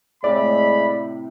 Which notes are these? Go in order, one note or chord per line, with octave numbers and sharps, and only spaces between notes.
A2 C3 G#3 D5 B5